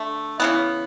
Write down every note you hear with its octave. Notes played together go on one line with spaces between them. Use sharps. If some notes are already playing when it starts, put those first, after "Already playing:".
Already playing: D3 A3
C#3 E3 B3